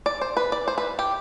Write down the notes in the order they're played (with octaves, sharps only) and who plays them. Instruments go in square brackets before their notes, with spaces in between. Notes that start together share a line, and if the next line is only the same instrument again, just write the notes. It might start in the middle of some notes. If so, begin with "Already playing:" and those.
[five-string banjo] D5
C5
B4
D5
C5
B4
G4